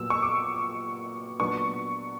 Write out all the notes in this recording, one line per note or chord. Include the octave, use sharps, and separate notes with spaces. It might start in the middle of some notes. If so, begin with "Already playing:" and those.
Already playing: A#2 F#3 B3 E6
C#6
D6
A#2 F#3 B3 D4 C#6